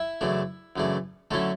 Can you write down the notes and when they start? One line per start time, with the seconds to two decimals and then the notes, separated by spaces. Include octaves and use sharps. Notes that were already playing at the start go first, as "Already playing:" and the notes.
Already playing: E4 E5
0.21 F#2 C#3 E3 A3 D4
0.76 F#2 C#3 E3 A3 D4
1.31 D3 F#3 A3 C#4 E4 A4